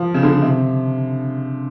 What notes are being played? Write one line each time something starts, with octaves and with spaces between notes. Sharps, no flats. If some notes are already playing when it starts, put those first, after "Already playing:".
Already playing: F3
C#3
D3
C3